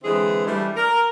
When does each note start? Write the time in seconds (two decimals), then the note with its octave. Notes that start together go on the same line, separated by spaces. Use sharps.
0.03 D3 E3 G#3 C4 E4 G#4
0.46 E3 G3 A3 D4
0.76 A#4